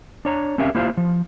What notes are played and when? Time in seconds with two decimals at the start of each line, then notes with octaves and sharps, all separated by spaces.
0.25 D4 C#5 A#5
0.58 C4 C#4 G4 A#4 E5 F5
0.75 A#3 E4 F4 G4 C5 F5
0.97 F3